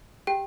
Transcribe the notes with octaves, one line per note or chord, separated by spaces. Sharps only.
G4 G5